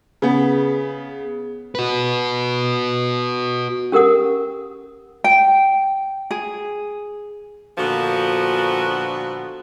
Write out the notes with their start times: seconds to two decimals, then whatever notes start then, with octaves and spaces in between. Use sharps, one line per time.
0.22 C#3 B3
1.75 F#4 B4
3.92 C#4 G4 A#4 F#5 D#6
5.24 G5
6.31 G#4
7.78 A#2 D3 F3 B3 F#4